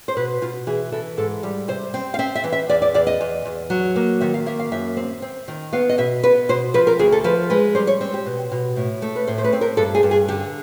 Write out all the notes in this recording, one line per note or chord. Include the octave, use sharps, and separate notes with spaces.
C5
B2 B4
B2 F4
E3 G#4
E3 A4
G#2 A4
G3
C3 C5
C4
F5
C4 E5
E5
E3
E5
E2 D5
D5
E2 D5
D#5
E2
E2
F#3
A#3
D#3 E5
F5
A#3 E5
F5
F#2 E5
C4
C4
D#3
B3 F5
D#5
B2 E5
B3 B4
B2 C5
F3 B4
A#4
D2 G#4
A4
F3 B4
G#3 B4
G3 C5
C#5
C4
G4
B2
B2
A2
A3
B4
A2 C5
C5
B4
C4
A#4
G2 A4
G#4
G2
G#4
D3 G4